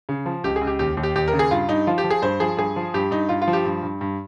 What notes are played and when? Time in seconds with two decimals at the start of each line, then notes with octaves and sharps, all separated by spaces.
0.09 C#3
0.26 F3
0.44 C#2 G4
0.56 G#4
0.61 C#2
0.67 G4
0.79 D#2 G4
0.97 D#2
1.03 G4
1.16 D#2 G4
1.28 A#4
1.33 C#3
1.39 G#4
1.51 G2 F4
1.69 G2 D#4
1.87 F3 F4
1.98 G4
2.04 F3
2.10 G#4
2.22 G2 C5
2.40 F3 G#4
2.57 G2 G#4
2.76 F3
2.94 G2 G4
3.11 G2 D#4
3.29 G2 F4
3.42 F4
3.48 F3
3.53 G4
3.65 G2
3.83 G2
4.01 G2